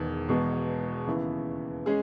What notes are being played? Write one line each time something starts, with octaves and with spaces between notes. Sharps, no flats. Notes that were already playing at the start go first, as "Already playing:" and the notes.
Already playing: E1 E2 D#3
E1 E2 B2 G#3
D#2 C#3 E3 B3 E4
G#3 C#4 G#4